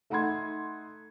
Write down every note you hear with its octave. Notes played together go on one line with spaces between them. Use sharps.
A3 D#4 F#5 B5 C6 G#6